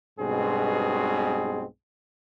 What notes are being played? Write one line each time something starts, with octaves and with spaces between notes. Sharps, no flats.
B1 G2 B2 G#3 C4 G#4